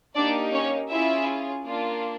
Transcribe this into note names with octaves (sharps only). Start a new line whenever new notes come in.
A#3 D4 D#4 G4 D5
C#4 C#5
C#4 E4 F4 G#4 E5
A#3 D4 F4